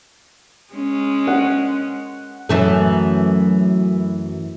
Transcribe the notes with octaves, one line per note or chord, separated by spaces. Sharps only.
G#3 C#4
F#5
F#2 E3 A3